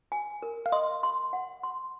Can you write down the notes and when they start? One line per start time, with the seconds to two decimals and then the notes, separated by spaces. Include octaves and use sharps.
0.12 G#5
0.43 A#4
0.66 F5
0.72 D#5 C6
1.03 C6
1.33 F#5
1.63 C6